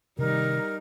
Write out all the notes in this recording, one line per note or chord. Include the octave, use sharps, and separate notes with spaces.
C3 D#3 G3 D#4 A#4